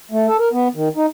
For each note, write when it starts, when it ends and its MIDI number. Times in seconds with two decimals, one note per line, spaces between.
0.11 0.27 57
0.27 0.37 69
0.39 0.49 70
0.52 0.68 59
0.75 0.88 51
0.96 1.06 63